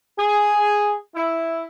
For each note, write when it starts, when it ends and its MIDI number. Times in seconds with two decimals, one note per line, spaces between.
0.18 0.95 68
1.13 1.64 64